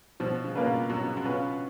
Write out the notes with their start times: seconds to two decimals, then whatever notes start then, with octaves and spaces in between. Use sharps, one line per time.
0.20 B2 F3
0.44 C#3
0.56 A#3 F4 B4
0.66 B2
0.90 B2 F#3
1.03 C#3
1.17 B2
1.25 C#4 F4 B4